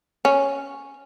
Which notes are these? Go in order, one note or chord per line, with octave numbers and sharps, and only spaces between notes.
C#4